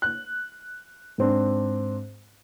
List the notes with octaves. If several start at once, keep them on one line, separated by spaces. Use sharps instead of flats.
F#6
G#2 C4 D4